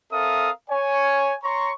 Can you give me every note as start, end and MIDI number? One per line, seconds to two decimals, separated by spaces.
0.12 0.50 60
0.12 0.50 69
0.12 0.50 70
0.12 0.50 76
0.12 0.50 77
0.12 0.50 87
0.70 1.34 73
0.70 1.34 80
1.43 1.71 73
1.43 1.71 82
1.43 1.71 84
1.43 1.71 85